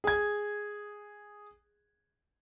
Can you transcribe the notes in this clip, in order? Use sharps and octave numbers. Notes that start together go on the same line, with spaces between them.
G#4 G#6